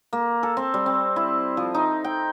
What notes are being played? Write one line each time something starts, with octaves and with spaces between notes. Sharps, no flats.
A#3
A4
C4
G3
C4
E4
F3
D#4
G5